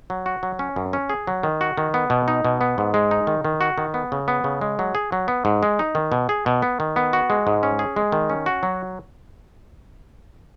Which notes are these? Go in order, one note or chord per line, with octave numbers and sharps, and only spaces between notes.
F#3
F#4
F#3
C#4
F#2
C#4
G#4
F#3
D#3
F#4
D#3
B3
B2
D#4
B2
B3
G#2
G#3
D#4
D#3
D#3
F#4
D#3
B3
C#3
B3
C#3
G#3
F#3
G#4
F#3
B3
G#2
G#3
D#4
D#3
B2
G#4
B2
B3
D#3
B3
F#4
G#3
G#2
C#4
G#4
G#3
D#3
C#4
F#4
F#3